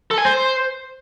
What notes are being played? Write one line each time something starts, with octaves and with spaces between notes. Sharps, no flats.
A4
G#5
C5